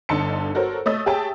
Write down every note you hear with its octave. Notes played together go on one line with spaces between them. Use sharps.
G1 D3 D#4 A5 C6 C#7
F#4 A4 A#4 C5 C#5
A3 C#5 D#5 D#6 E6 A6
G4 G#4 C#5 E5 G5 A5